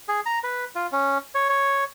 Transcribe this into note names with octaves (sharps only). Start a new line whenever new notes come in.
G#4
A#5
B4
F4
C#4
C#5
C#5